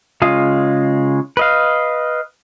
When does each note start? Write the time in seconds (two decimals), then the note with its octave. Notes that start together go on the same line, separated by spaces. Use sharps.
0.22 C#3 G#3 F4 F5 D#6
1.37 B4 D#5 F5